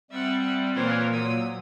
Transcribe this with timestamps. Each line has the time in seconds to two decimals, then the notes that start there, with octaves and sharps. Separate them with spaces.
0.11 G3 C4 E5 F#5
0.45 F#5
0.75 A#2 E3 A#4 C5 C#5
1.12 F#3 D#6 E6